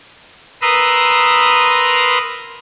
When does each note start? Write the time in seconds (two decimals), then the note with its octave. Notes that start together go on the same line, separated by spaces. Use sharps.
0.62 A#4 B4 A#5 C6 D#6 E6